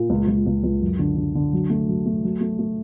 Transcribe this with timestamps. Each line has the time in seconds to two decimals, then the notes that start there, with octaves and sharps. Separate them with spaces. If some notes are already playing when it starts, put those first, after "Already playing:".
Already playing: A#2
0.10 C#2
0.28 C#2
0.47 C#2
0.64 C#2
0.81 F#2
0.99 D3
1.16 D3
1.35 D3
1.53 F#3
1.70 A3
1.88 F#3
2.06 A3
2.24 F#3
2.41 A3
2.59 A3